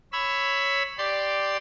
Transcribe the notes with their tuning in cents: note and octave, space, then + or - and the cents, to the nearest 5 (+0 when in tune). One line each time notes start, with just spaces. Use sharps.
C#5 +0 B5 +10 E6 +0
G4 +0 D5 +5 C6 +0